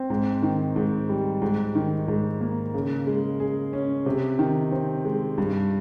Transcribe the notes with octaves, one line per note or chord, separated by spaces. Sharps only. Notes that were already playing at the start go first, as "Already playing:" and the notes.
Already playing: C4
G#2
D#3
G#2
G3
G#2
D#3
G#2
A#3
C#3
G#3
G#4
C#4
C3
D#3
C4
G#3
G2